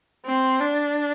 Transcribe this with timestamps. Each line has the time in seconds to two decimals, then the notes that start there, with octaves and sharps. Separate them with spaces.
0.26 C4
0.60 D4